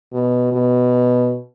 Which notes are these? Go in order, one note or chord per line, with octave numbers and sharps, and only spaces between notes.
B2
B2